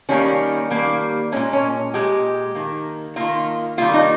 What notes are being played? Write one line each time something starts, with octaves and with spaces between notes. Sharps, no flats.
D#3 G3 A#3 C#4
D#3 G3 A#3
A#2 G#3 C#4
C#4
A#2 G#3 G4
D#3 A#3
D#3 A#3 F4
D#3 G3 A#3 F4
D#4